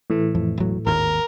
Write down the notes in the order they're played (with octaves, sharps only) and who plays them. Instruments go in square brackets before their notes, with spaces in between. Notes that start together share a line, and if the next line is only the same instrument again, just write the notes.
[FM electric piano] A2 E3 A3
[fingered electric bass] F2
E1 F#3
[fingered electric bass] G#1 D#2 [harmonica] A#4